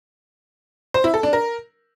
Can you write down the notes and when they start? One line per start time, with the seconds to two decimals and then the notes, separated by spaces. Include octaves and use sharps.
0.94 C5
1.04 E4
1.14 A4
1.23 D4
1.33 A#4